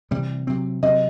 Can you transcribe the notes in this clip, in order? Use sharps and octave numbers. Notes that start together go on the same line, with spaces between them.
C3 E3 G3
C3 F#3 C4
C3 F#3 C4 D#5